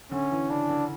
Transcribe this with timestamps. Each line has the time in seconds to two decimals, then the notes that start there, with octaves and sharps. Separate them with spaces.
0.12 D3 C#4
0.31 E3
0.50 C#3 D4
0.69 D3